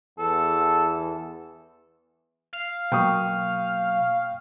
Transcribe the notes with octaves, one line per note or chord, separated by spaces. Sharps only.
E2 A4
F5
B2 F#3 A#3 G5 C#6 D#6